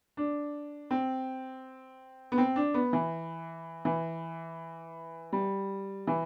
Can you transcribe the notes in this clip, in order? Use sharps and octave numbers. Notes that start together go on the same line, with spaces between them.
D4
C4
B3
C4
D4
B3
E3
E3
G3
E3